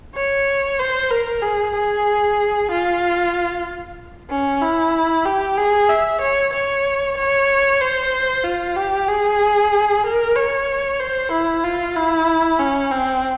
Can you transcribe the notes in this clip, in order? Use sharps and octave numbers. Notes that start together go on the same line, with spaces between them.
C#5
C5
A#4
G#4
G#4
F4
C#4
E4
G4
G#4
E5
C#5
C#5
C#5
C5
F4
G4
G#4
A#4
C#5
C5
E4
F4
E4
C#4
C4